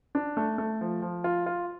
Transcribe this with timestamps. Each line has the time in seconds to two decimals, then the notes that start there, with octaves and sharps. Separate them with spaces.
0.15 D4
0.37 A3
0.58 A3
0.81 F3
1.02 F3
1.24 F4
1.46 F4